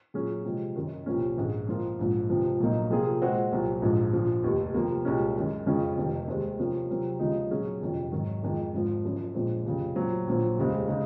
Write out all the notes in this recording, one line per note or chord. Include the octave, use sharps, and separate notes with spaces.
A#2 F#3 C#4 G#4
C3 F3 G#3
F#1 F#2 D#3
C2 A#2 F3 A#3 C#4
A#1 G#2 D#3 G#3 C#4
A#2 F3 C4 F4 A#4
A#1 G#2 F3
C#2 C3 F3
A#1 A#2 F#3 A#3 D#4
C3 F3 A#3 F4 G#4
A#2 G#3 C4 F#4
C2 A#2 F#3 C4
A#1 G#2 F3 G#3
A#1 A#2 F3
F1 D#2 D#3
C3 F3 A#3
C2 A#2 G#3 C#4
F#2 D#3 G#3
F2 C#3 F3 G#3 C#4
F1 F2 C3 D#3
D#2 D#3 G#3 C4
C3 F3 A#3 C#4
C3 F#3 C4 F4 A#4
D#2 C#3 F3 G#3 D#4
A#2 F#3 C#4 G#4
F#1 F2 C3 D#3
G#1 G#2 D#3 F#3
F2 D#3 G#3 D#4
G#1 G#2 F3
F#1 F#2 F3
A#1 A#2 F3 G#3 C4
F1 F2 C#3
A#2 F#3 C4
A#1 A#2 F#3 C4
F1 D#2 C#3 G#3 C4
C#3 G#3 D#4